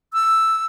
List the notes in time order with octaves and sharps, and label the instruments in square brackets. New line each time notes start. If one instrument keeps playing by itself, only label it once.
[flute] E6